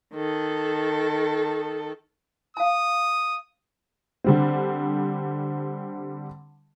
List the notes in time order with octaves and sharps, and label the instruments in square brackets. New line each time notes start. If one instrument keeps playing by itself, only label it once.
[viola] D#3 A4
[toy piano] F5 A5 [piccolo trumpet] D#6
[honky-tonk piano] D3 G3 C4